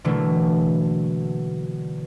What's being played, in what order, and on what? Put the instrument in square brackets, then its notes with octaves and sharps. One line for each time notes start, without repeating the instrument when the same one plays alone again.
[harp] B2 D3 E3 F#3 A3 A#3